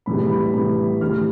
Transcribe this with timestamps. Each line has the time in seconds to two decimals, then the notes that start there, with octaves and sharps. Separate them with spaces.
0.06 A2 E3 G3 B5
0.31 B5
0.54 A2 E3 G3
1.01 A2 E3 G3 F6